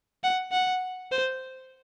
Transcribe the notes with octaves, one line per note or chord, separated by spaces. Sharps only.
F#5
F#5
C5